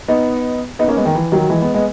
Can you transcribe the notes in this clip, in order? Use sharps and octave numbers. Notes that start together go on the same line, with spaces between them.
B3 D#4
B3 D#4
A#3 C#4
G#3 B3
D#3
E3
D#3 F#3
E3 G#3
G#3 B3
G#3 B3